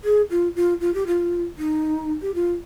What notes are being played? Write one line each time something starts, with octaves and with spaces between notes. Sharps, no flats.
G#4
F4
F4
F4
G4
F4
D#4
G4
F4